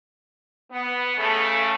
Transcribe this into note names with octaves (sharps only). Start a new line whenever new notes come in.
B3
C#3 A3